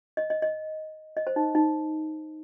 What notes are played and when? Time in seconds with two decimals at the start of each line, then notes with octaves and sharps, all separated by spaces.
0.17 D#5
0.30 D#5
0.42 D#5
1.17 D#5
1.27 C5
1.36 D#4
1.55 D#4